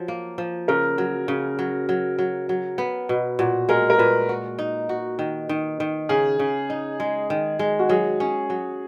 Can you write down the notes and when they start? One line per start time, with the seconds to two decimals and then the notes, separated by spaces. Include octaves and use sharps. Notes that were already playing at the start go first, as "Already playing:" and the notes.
Already playing: F3 F#3
0.08 A#3
0.38 F3
0.68 C#3 A#4
0.98 F#3
1.28 C#3
1.59 F#3
1.89 F#3
2.19 F#3
2.49 F#3
2.78 B3
3.09 B2
3.39 A#2 F#4
3.69 G#3 A#4
3.90 A#4
3.98 A#2 B4
4.29 F#4
4.59 D#4
4.89 F#4
5.19 D#3
5.49 D#3
5.80 D#3
6.09 C#3 G#4
6.39 C#3
6.70 D#4
7.00 G#3
7.30 D#3
7.59 G#3
7.79 F#4
7.89 F#3 G#4
8.20 C#4
8.50 F#3